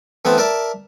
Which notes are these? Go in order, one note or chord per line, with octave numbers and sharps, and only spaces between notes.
E3 A3 B3 C4 A5
A#4 D5 E5 A5